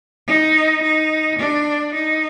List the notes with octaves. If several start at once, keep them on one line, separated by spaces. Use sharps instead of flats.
D#4
D#4
D4
D#4